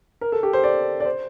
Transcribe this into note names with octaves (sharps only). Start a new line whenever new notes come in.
A#4
A4
G4
C5
D5
D5
C5